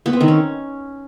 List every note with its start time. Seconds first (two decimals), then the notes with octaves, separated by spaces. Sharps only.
0.06 B3
0.13 C4
0.20 D#3
0.28 C#4